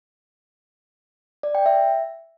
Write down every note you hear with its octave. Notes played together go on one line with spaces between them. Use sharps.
D5
G5
E5